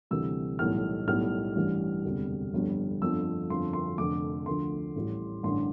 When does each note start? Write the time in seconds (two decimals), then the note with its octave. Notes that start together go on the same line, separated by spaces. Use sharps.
0.11 D2 C3 E3 G3 E6
0.59 B1 A2 E3 G3 F6
1.07 B1 A2 G3 F6
1.56 A1 G2 E3 G3
2.05 E1 D2 C3 G3
2.53 G1 F2 D3 G3
3.01 G1 F2 D3 F3 E6
3.49 G1 F2 D3 F3 C6
3.73 C6
3.98 F1 F2 D3 D6
4.46 D2 D3 F3 C6
4.96 A1 A2 G3
5.43 A1 G2 D3 C6